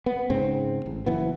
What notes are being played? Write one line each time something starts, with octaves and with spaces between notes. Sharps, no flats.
B3
G#2 C#3 C4
A1
F#1 E3 B3